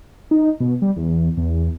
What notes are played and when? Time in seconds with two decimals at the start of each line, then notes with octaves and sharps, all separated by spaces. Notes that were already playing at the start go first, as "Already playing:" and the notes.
0.31 D#4
0.60 B2
0.82 G3
0.97 E2
1.37 E2